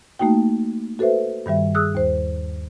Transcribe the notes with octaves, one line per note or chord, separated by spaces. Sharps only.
A3 A#3 D#4 F#4 G5
F#4 A4 B4 C5 E5
G2 D#3 G3 E5
G#4 D#6 E6 F#6
D#2 C5